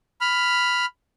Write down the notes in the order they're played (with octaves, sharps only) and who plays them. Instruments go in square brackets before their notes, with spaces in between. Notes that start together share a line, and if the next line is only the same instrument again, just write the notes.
[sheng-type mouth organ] B5 F6